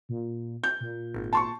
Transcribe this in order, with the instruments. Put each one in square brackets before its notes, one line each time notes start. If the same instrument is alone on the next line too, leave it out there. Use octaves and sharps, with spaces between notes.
[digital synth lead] A#2
[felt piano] G6
[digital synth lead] A#2
[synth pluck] G#1
[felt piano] A5 C6 C#6